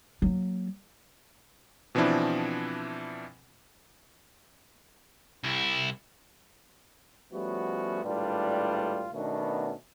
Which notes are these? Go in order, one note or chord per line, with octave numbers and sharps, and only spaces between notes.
F#3 A#3
B2 E3 F3 C4 D4 E4
C2 E4
F3 G3 A3 B3 C#4 F#4
G#1 A2 G3 D4 F4 B4
B2 D#3 A3 B3 C#4 D4